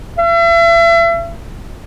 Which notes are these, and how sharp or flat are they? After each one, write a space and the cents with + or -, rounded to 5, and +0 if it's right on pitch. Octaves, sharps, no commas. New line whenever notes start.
E5 +40